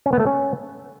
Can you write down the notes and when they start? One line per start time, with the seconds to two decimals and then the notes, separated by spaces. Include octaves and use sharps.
0.06 C#4
0.13 B3
0.20 A3
0.26 C#4